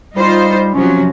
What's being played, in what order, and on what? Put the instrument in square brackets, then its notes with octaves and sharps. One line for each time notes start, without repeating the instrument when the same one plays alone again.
[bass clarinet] G3 [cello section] D#4 F4 C5
[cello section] C3 F3 F#3 [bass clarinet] C#4